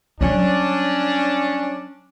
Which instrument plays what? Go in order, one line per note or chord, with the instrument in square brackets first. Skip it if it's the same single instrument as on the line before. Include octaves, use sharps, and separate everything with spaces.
[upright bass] F#3 G3 [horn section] C#4 D4